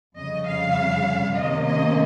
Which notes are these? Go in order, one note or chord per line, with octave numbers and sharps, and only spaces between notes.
F2 C#3 G3 D#5
F5
C3 D#3 A#3 C#4 D#5
D#5